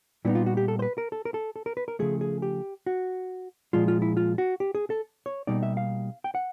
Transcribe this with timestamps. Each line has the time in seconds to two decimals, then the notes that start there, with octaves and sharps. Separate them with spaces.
0.25 A#2 G3 B3 D#4 E4
0.35 F4
0.46 F#4
0.57 G4
0.68 A4
0.79 C5
0.82 B4
0.98 A#4
1.12 A4
1.25 A#4
1.34 A4
1.56 A4
1.66 A#4
1.77 B4
1.88 A#4
1.99 C#3 F3 A3 G#4
2.21 G#4
2.42 G4
2.86 F#4
3.73 A#2 F3 G#3 F4
3.88 F4
4.02 E4
4.17 F4
4.38 F#4
4.60 G4
4.75 G#4
4.90 A4
5.26 C#5
5.47 B2 G3 A#3 D#4 D5
5.63 E5
5.77 F5
6.24 G5
6.35 F#5